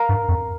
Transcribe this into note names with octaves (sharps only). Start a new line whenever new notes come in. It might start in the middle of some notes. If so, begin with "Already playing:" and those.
Already playing: A#4 F5 A#5
G2
F2